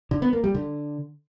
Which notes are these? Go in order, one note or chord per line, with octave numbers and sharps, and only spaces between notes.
D3
B3
A#3
G3
D3